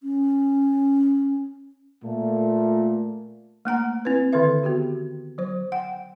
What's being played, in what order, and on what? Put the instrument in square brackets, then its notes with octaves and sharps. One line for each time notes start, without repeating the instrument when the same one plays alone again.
[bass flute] C#4
[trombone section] A#2 A3
[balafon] A3 A#3 F#5 A#5
C4 E4 B4
D3 D#3 A4 B4 E5
B3 F#4 G4
F#3 C5
F#5 G5